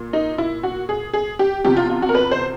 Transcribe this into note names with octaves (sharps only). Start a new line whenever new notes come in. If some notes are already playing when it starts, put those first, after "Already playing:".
Already playing: A#2
D#4
E4
F#4
G#4
G#4
G4
E2 C3 F3 G4
F4
F4
F#4
A#4
B4
C5